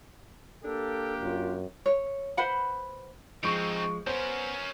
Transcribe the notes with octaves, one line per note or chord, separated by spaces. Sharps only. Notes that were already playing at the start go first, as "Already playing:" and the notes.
A#3 D4 G4 A4
F#2 F4
C#5
B4 C5 F#5 B5
F3 G#3 C4 D#4 C#6 D7
B3 C#4 A#4 C5